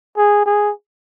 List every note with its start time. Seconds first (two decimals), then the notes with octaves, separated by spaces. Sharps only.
0.17 G#4
0.46 G#4